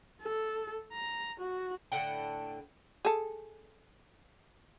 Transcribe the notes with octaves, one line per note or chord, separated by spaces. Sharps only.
A4
A#5
F#4
A2 D3 F#5 G5
G#4 A4